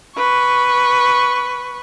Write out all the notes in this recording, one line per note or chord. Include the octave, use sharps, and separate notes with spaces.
B4 C#6